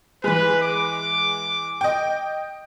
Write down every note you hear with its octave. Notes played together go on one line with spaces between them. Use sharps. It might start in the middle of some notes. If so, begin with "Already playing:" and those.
E3 G#3 B4
D6
D#5 G5